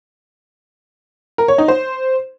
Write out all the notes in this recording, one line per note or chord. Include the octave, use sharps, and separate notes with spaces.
A#4
C#5
D#4
C5